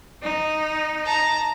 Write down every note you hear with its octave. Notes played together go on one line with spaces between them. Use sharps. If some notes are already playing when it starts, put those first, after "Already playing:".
D#4
A5 A#5